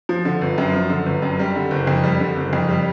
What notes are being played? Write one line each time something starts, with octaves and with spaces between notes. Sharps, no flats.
F3
D3
G1
F#2
F3
D3
G1
F#2
G3
D3
F#1
F2
G3
D3
F#1
F2
G3